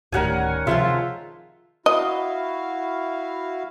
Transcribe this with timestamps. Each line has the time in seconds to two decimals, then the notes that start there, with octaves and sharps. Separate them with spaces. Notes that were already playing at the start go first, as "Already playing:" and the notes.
0.12 D1 A2 D#3 G3 C#4 A#4 F#5 G#5
0.67 C3 F3 G#3 F4 C5 E5 A5
1.86 E4 F#4 D#5 F5